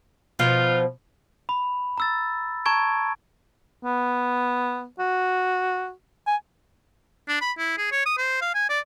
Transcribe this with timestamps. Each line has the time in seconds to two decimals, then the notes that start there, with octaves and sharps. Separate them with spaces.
0.39 B2 F3 D#4 F4
1.49 B5
1.98 A#5 E6 A6
2.66 A5 A#5 C#6 G#6 D7
3.84 B3
4.99 F#4
6.27 G#5
7.28 D4
7.41 B5
7.58 E4
7.78 G#4
7.92 C#5
8.06 D#6
8.18 C5
8.41 F5
8.55 G#5
8.69 D5